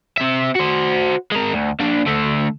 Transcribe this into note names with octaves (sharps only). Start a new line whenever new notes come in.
C4 E5
F#4 C5
G#3 A#4
D2
A#2 D4
D3 A3